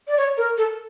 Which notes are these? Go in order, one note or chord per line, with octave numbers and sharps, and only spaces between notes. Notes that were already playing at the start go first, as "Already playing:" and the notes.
D5
C#5
A#4
A4